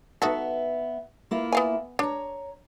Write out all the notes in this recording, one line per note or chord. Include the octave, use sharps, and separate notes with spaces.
B3 D#4 F#4 A4 E5
A#3 E4 F4
B3 F5 G#5
D4 C#5 A#5